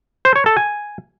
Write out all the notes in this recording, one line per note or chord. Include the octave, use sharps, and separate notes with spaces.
C5
C#5
A4
G#5